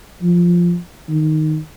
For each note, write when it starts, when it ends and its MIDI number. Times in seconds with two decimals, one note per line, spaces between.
0.23 0.77 53
1.09 1.58 51